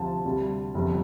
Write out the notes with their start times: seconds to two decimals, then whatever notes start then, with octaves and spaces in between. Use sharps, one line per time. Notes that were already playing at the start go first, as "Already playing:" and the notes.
Already playing: D2 C3 F3 A5
0.25 D2 C3 G3
0.74 G1 F2 C3